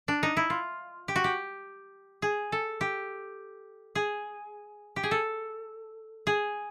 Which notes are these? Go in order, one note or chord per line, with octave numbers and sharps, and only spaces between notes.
D4
D#4
E4
F4
G4
F#4
G4
G#4
A4
G4
G#4
G4
G#4
A4
G#4